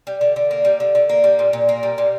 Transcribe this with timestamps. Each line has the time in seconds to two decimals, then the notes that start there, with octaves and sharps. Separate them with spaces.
0.07 G3
0.21 D3
0.36 D3
0.51 A#3
0.65 G3
0.80 D3
0.95 D3
1.09 A#3
1.24 G3
1.39 A#2
1.53 A#2
1.69 A#3
1.83 G3
1.98 A#2